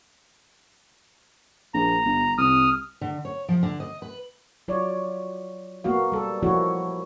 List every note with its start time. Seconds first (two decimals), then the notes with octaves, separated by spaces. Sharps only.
1.74 A#1 A#5
2.05 G1
2.38 C2 D#6 F6
3.01 D3
3.25 C#5
3.49 F3
3.63 D3
3.80 D#5
4.02 B4
4.68 F#3 F4 C#5 D5
5.84 A#3 B3 F#4 F5
6.12 G3 A4
6.43 F3 A#3 E4 F#4 A4 C#5